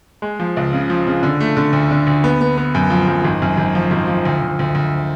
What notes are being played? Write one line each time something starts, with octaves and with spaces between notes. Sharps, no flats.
G#3
F3
C#2
C#3
F3
C#3
D3
A3
D3
D2
D3
D2
B3
B3
B3
F#2
F3
F#2
G#1
F#2
G#1
F3
G#1
F3
D2
D2
D2
D2